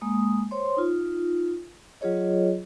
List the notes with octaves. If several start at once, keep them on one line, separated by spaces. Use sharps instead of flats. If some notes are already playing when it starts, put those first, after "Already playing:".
G#3 A#3 D#6
C5 C#5 C6
D#4 F4
F#3 F4 G#4 C#5 D#5